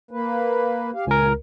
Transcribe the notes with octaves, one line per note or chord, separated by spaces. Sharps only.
A#3 B4
G4 F5
C#2 A#2 A#4 G#5